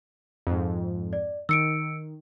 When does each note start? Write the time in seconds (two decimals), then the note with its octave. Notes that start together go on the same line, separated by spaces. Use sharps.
0.47 F2 G#2
1.13 D5
1.49 D#3 E6 C#7 D7